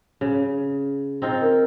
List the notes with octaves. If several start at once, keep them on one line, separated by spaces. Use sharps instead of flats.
C#3
C4 D#4 F4
A#4